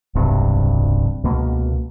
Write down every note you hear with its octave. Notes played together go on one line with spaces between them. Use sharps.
D1 B1 G2 C3
C#2 B2 A#3